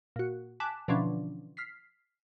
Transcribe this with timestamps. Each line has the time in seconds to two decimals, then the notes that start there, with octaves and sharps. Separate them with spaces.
0.16 A#2 F#4
0.60 G#5 A5 D6 F#6 B6 E7
0.88 B2 D3 E3 F3 C#4 D4
1.57 F6 B6 C7